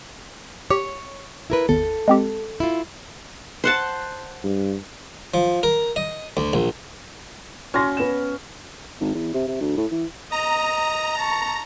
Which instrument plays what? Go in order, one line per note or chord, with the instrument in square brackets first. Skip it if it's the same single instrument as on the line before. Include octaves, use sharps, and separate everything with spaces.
[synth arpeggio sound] G4 [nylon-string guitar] C#5
[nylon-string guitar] E4 A#4 B4
[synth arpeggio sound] G#1 E2 [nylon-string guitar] A4
[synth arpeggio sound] G#3 C4 G4
[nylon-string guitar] E4 F4
[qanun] C5 F#5 A5
[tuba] G2
[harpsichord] F3
A#4
D#5
D2
A#1
[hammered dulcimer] C#4 [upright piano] F#4 C6 A#6
[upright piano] B3 E7
[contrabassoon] G#1
E2
C3
C3
D2
A2
E3
[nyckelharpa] D#5 [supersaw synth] A#5
[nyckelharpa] A5 C#6